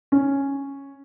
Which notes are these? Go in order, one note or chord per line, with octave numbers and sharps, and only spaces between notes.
C#4